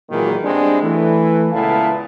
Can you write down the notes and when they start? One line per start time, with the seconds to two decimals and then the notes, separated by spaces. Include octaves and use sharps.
0.10 A#2 D#3 E3 F#3 G#3 A#3
0.43 G3 G#3 B3 C4 D4
0.82 E3 A3
1.53 C#2 A#2 B3 E4 F5 A5